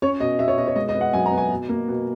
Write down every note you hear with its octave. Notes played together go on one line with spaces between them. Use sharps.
C#4 C#5
B2 D#5
B2 E5
C#5
B2 D#5
C#5
G#3 D#5
D#5
B3
F#5
F#2 G#5
A#5
B3
G#5
B2
A#3
B2